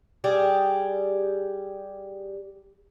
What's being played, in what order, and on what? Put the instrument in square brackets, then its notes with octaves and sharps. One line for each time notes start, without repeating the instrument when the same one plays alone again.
[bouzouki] G3 G4 G#4